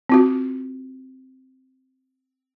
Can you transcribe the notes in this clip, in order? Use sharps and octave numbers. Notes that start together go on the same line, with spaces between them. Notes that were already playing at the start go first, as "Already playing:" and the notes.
C4 F4 F#4